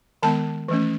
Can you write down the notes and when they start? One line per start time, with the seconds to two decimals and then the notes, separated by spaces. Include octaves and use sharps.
0.23 D#3 G#3 B3 A5
0.68 E3 A3 C#4